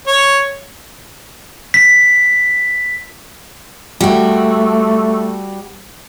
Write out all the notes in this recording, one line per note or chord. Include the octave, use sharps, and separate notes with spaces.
C#5
B6
G3 A3 F#4